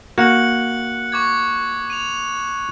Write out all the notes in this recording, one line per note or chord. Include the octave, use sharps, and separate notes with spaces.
A#3 F#4 F#6 C#7 F#7
C#6 D6 G#6
D#7 F7